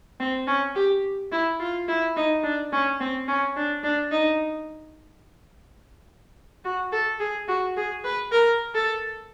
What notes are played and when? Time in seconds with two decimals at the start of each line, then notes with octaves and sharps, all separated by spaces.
0.20 C4
0.47 C#4
0.75 G4
1.32 E4
1.60 F4
1.88 E4
2.16 D#4
2.43 D4
2.72 C#4
3.00 C4
3.28 C#4
3.56 D4
3.83 D4
4.11 D#4
6.64 F#4
6.92 A4
7.20 G#4
7.48 F#4
7.77 G#4
8.04 B4
8.32 A#4
8.74 A4